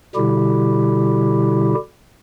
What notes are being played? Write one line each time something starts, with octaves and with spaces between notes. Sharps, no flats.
B2 D3 G3 E4 G4